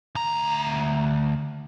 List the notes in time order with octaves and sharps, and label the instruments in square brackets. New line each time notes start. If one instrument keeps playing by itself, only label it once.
[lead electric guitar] D2 A#5